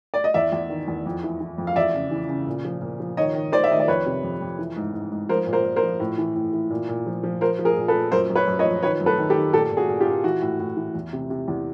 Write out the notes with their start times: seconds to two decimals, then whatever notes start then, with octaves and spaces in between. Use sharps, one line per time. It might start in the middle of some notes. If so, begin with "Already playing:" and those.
0.14 D5
0.24 D#5
0.34 E2 D5 E5
0.52 E2
0.70 D#3
0.88 E2
1.06 F2
1.23 E3
1.41 E3
1.58 F2
1.67 F5
1.76 E2 D5 E5
1.94 C#3
2.11 E3
2.29 C#3
2.47 A#2
2.65 F3
2.81 A#2
3.00 F3
3.17 D#3 C#5 D#5
3.35 D#3
3.52 D#3 C5 D5
3.64 E5
3.70 D#3 D#5
3.80 D5
3.88 F2 B4 C#5
4.06 C3
4.23 F2
4.41 F2
4.59 E3
4.76 G#2
4.94 G#2
5.12 G#2
5.29 F3 A#4 C5
5.47 A#2
5.53 A#4 C5
5.64 A#2
5.76 A#4 C5
5.83 F3
6.00 A2
6.18 E3
6.36 A2
6.53 E3
6.70 A#2
6.89 A#2
7.06 F3
7.23 F3
7.41 F3 A#4 C5
7.59 F3
7.65 G#4 A#4
7.77 A#2
7.88 A4 B4
7.94 A#2
8.12 F#2 A#4 C5
8.30 F#2
8.36 B4 C#5
8.47 F#2
8.59 C#5 D#5
8.65 F3
8.82 D#3 B4 C#5
9.00 F#2
9.06 A4 B4
9.18 D#3
9.30 G4 A4
9.36 D#3
9.53 A#2 G4 A4
9.71 A#2
9.77 F#4 G#4
9.89 A#2
10.00 F4 G4
10.06 A#2
10.24 E3 F#4
10.42 A2
10.59 A2
10.77 E3
10.95 E2
11.13 C3
11.30 C3
11.48 E2